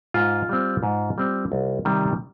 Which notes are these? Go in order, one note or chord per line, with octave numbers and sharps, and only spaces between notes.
G#2 F4
G3 C4
G#2
G3 C4
C2
C3 D#3 G3